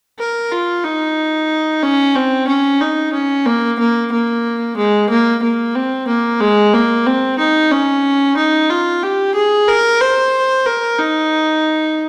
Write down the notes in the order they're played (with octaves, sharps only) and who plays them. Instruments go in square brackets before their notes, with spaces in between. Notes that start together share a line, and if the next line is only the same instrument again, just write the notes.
[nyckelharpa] A#4
F4
D#4
C#4
C4
C#4
D#4
C#4
A#3
A#3
A#3
G#3
A#3
A#3
C4
A#3
G#3
A#3
C4
D#4
C#4
D#4
F4
G4
G#4
A#4
C5
A#4
D#4